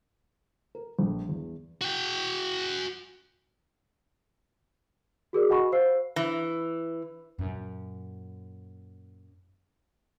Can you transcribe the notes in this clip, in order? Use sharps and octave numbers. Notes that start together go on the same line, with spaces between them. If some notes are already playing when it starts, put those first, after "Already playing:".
A#4
A#1
E2
F#4 G5
F#4 G#4 A#4 D5
F#4 D#5 F#5 G#5 B5 C#6
C5 F5 E6 C7
E3
F#2 A#2